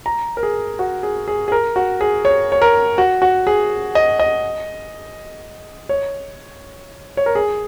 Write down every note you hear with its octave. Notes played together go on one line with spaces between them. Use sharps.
A#5
A#4
G#4
F#4
G#4
G#4
G#4
A#4
F#4
G#4
C#5
C#5
A#4
F#4
F#4
G#4
D#5
D#5
C#5
C#5
A#4
G#4